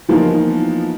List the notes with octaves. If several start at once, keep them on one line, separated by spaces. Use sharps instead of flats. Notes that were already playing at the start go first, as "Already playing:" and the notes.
E3 F3 A#3 B3 D#4 F4